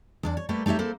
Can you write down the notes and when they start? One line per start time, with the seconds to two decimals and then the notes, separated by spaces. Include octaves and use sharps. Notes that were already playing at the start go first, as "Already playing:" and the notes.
0.23 E2 D4 D5
0.37 C#5
0.49 G3 A3 A#3 G4 B4
0.66 A3 D#4 G4 C#5 E5
0.79 A#3 E4 A4 C5